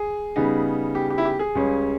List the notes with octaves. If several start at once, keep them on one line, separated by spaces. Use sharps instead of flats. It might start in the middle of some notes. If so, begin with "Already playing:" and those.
Already playing: G#4
C#3 G3 B3 D#4
G4
G4
E4
G4
G#4
C#2 C#3 G3 C#4